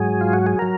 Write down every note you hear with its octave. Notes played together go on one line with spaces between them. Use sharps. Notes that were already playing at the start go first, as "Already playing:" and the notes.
Already playing: G#2 F#3 G#4
F4
F#4
G#4
F#3 A#4